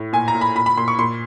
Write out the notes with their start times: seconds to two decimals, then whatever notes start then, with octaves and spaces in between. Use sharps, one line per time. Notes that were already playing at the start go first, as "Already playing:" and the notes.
Already playing: A2
0.13 A#2 G#5
0.28 A#5
0.35 A#2
0.41 B5
0.55 A#2 B5
0.66 B5
0.77 A#2 C6
0.88 C#6
0.99 A#2 C6